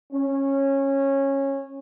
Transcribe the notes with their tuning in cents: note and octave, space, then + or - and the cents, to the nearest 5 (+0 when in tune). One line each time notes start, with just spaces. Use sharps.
C#4 -15